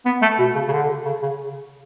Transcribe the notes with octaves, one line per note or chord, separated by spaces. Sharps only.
B3
A3
B2
C#3
C#3
D3
C#3
C#3